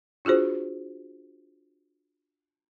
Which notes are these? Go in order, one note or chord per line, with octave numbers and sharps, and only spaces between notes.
D4 F4 F#4 G#4 C5